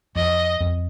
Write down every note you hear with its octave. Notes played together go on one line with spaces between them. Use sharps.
F2 D#5
F2